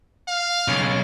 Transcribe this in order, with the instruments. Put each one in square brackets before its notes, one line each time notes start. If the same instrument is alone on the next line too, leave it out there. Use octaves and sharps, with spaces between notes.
[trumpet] F5
[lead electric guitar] B1 C#3